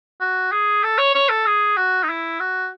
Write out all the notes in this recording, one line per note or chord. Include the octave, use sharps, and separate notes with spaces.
F#4
G#4
A4
C#5
C#5
A4
G#4
F#4
D#4
E4
F#4